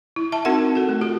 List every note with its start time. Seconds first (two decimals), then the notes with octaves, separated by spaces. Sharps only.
0.16 E4
0.32 E5 A5
0.45 C4 D#4 F#4 A#4 F#5
0.75 F#4 A4
0.89 A3
1.01 F4 G4